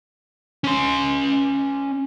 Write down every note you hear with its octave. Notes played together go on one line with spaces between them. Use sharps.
C#4 C6